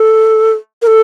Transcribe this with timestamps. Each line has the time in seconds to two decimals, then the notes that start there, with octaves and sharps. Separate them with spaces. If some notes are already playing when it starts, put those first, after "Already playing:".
Already playing: A4
0.82 A#4
0.87 A4